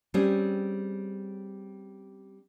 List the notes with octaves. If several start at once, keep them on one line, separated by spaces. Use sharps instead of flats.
G3 C4 C#4 G#4